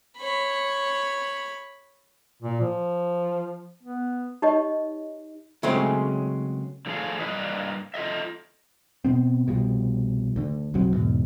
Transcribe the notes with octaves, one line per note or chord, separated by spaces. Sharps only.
C#5 B5
A#2
F3
B3
D#4 G4 C#5 D#5
C#3 F#3 G#3 A3 C4 C#4
D3 F3 A3 G#4 F5
G2 A#3 D4 B4 D#5
F4 A4 D#5 E5
B2 B3 C4
C2 B2 F3 G3
D2 D3
F#1 B1 F#3 C4
E2 G#2 B2